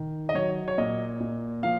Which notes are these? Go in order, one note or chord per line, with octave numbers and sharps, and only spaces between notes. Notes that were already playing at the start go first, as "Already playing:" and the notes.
Already playing: D#3
D#5
F#3 C#5
C#5
A#2 D#5
A#2
F3 F5